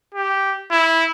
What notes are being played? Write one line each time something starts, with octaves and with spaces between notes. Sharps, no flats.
G4
E4